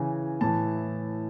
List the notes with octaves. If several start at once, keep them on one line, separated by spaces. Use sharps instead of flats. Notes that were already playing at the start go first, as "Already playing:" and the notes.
Already playing: C#3 E3 G#5
A2 E3 A5